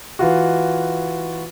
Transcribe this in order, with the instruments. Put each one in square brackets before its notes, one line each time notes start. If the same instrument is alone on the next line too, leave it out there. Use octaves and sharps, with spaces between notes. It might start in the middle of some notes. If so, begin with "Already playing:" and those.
[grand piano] E3 F4 F#4